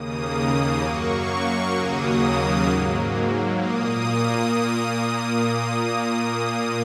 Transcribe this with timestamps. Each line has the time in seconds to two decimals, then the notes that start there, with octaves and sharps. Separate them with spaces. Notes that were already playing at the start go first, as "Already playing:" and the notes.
Already playing: D#2 C#3 A#3 D#6
0.81 F#2 F#3 A#3 C#6
1.74 D#2 C#3 F#3 A#3 D#6
2.68 G#2 F#3 A#3
3.61 A#2 A#3 D#6